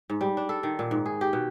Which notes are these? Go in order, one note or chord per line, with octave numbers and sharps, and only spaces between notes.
G#2
G3
D4
A4
D#3
A#2
G#2
G#4
G4
B2